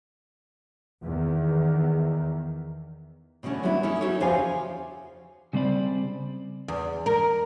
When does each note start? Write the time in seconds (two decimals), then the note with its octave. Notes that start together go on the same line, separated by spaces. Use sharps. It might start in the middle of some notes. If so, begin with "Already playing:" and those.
1.03 E2 D#3
3.43 B2 D3 E3 A3 C#4
3.63 D3 F#3 G3 B3 E4
3.83 C#4 D#4 E4 A4
4.01 D#4 F#4 A4 A#4 C#5
4.20 E2 C#3 F3 G4 F5 G#5
5.53 C#3 G3 C4 D5 B5
6.68 E2
7.06 A#4